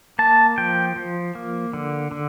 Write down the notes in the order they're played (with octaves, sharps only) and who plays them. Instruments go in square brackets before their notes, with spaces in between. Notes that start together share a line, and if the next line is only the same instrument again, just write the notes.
[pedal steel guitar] A#3 A5
F3 G5
F3
A#3
D3
D3